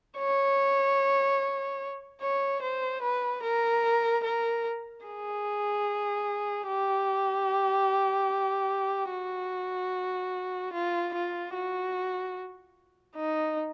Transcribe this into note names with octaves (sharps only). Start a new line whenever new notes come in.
C#5
C#5
C5
B4
A#4
A#4
G#4
G4
F#4
F4
F4
F#4
D#4